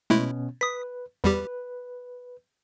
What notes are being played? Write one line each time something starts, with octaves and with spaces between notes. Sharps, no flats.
B2 G#3 A3 B3 C#4 E4
B4 D#6 B6
E2 G3 G4 B4